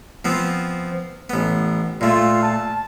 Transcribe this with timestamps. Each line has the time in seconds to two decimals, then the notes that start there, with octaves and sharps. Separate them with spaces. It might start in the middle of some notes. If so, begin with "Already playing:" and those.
0.25 F3 B3 C4
1.30 A1 B3
2.01 A#2 A3 F4
2.42 A5